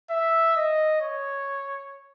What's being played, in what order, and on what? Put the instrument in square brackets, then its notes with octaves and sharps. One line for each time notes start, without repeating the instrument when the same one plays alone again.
[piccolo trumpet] E5
D#5
C#5